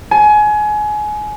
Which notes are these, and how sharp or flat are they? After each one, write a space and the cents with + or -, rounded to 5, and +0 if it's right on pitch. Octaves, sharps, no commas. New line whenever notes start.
G#5 +25